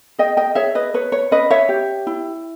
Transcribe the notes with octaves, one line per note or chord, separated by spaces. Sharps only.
G#4 D#5 G5
D#5 G5
G#4 C#5 E5
B4 D#5
B4 C#5
C#5
C#4 B4 D#5
C#5 E5
G4
E4